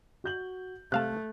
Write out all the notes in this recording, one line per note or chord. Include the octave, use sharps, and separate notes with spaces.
F#4 G6 F#7
C3 A3 F5 A5 F#6